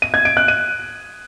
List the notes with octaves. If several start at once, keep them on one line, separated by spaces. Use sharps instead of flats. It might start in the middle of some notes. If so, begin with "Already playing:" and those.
D#7
G#6
D7
F#6
D#7